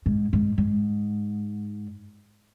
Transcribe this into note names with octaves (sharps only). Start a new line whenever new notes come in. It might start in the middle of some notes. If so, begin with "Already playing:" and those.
G#2
G#2
G#2